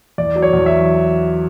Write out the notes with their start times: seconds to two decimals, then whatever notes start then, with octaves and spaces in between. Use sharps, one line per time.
0.18 E2 D5
0.36 F#3
0.42 C#5
0.53 E2
0.66 F#3 E5